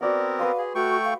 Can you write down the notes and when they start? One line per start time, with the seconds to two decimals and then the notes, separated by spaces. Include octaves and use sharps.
0.01 B3 C4 F#4 A#4 D5 F#5
0.39 B4 F5 C6 D#6
0.58 G#4
0.75 A3 F#4 G5 C#6
1.04 F5